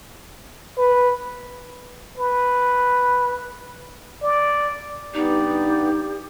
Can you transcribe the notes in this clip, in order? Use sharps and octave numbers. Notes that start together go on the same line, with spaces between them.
B4
B4
D5
G2 B3 D#4 G4 D5